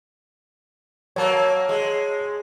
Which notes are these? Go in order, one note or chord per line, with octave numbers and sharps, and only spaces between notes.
F#3 A#3 C#5 A5
G#3